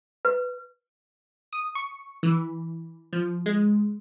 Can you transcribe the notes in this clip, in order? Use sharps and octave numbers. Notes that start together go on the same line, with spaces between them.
B4
D#6
C#6
E3
F3
G#3